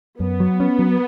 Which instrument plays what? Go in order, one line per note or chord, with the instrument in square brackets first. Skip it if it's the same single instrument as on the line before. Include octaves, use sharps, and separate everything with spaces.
[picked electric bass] F#2 [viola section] B3
[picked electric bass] F#3
C#4
F#3